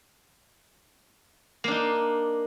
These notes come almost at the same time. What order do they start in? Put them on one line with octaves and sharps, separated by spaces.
A#3 D4 D#4